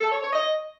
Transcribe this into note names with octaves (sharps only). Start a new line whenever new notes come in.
A4
C#5
C#5
D#5